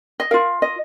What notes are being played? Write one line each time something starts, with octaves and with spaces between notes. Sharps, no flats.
D#5
F4 A#4 F5
D#5